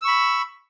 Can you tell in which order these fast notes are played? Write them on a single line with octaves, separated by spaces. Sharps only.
E6 C#6 B5